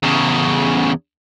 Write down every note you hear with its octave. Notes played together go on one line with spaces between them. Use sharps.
E2 C#3